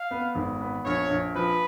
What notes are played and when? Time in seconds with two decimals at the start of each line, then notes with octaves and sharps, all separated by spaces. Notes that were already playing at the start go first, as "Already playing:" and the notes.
Already playing: F5
0.11 B3
0.35 G#1
0.60 B3
0.85 A#1 C#5
1.10 A#1
1.35 F3 B4